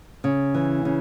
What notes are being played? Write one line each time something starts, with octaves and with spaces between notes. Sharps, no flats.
C#3
E3
C#3